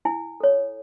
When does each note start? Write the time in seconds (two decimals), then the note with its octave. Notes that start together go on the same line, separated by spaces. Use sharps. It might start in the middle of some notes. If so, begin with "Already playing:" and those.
0.05 E4 G#5
0.40 A4 C#5